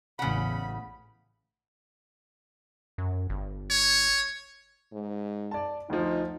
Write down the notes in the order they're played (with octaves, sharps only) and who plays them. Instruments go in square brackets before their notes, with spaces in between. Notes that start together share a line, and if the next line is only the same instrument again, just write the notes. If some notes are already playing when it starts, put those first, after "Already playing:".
[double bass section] A1 E2 A2 [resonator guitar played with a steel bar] C#3 F#5 [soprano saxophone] B5
[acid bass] F#2
G1
[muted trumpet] C#5
[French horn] G#2
[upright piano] D5 A5
[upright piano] D2 F3 [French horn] D#4